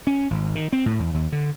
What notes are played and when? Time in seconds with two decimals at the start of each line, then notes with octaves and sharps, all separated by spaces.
0.07 C#4
0.31 G#1
0.55 D#3
0.73 C4
0.86 A2
0.99 E2
1.14 D#2
1.32 D3